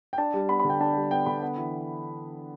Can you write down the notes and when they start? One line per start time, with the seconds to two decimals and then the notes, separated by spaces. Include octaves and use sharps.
0.13 G5
0.18 D4 A5
0.34 G3
0.49 B3 B5
0.59 B5
0.65 D3 G5
0.80 D4 A5
0.95 G3
1.11 B3 G5
1.26 D3 B5
1.42 B3
1.57 E3